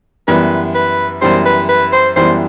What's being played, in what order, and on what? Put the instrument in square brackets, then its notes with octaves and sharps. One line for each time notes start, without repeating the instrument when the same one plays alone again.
[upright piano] F#2 E3 G3 B3 [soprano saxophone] B4
[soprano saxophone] B4
[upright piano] F#2 E3 G3 B3 [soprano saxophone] C5
[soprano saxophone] B4
B4
C5
[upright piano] F#2 E3 G3 B3 [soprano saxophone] C5